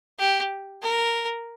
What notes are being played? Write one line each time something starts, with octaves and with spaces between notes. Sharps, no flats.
G4
A#4